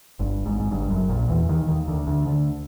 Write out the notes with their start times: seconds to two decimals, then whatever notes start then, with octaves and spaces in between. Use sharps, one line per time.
0.19 G1 G2
0.45 G#1 G#2
0.60 G#2
0.71 G1 G2
0.90 F#1 F#2
1.09 A#1 A#2
1.29 E2 E3
1.49 D#2 D#3
1.68 D#2 D#3
1.88 D2 D3
2.07 D2 D3
2.26 D2 D3